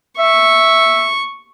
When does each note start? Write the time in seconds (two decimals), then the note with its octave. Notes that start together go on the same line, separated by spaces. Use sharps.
0.19 E5 C#6